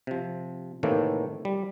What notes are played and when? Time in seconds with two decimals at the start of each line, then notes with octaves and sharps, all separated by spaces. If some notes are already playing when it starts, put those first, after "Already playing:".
0.07 C3 F3
0.83 A2 C3 D#3 E3 A3 A#3
1.45 G3